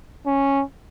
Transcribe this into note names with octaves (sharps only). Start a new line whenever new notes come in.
C#4